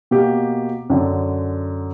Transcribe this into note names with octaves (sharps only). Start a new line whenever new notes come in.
B2 A#3 G4
F#2 D3